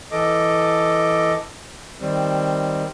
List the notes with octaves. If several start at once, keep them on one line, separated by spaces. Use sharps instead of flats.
E3 A4 D#5 D6
D#3 G3 C4